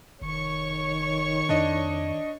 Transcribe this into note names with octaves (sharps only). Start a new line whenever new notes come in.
F1 D#3 C#5 C#6
F2 D4 D#5